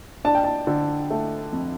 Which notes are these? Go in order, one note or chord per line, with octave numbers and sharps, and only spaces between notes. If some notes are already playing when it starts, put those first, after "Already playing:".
D4 A5
G5
A5
D3
A3
F2